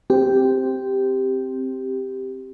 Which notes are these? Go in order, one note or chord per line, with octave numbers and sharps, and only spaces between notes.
C4 G4